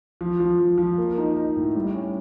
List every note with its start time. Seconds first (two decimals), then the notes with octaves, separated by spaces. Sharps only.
0.21 F3
0.40 F3
0.59 F3
0.78 F3
0.98 A#3
1.18 D#4
1.37 D#4
1.56 A2
1.76 G3
1.95 C#4